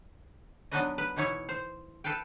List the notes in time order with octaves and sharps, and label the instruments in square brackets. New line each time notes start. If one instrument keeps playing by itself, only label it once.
[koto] F#3 B3 D4 D#4 B4 D#5
B4
B2 E3 D#4 E4 C#5
C5
A4 B4 F5 G5